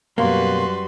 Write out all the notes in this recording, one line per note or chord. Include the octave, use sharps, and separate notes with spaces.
F#2 B2 G3 A#3 F#4 B4 C6